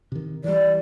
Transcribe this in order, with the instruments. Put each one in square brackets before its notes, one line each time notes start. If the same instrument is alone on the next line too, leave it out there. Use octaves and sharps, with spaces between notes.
[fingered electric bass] C3 D#3
[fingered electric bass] E3 G3 [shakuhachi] D5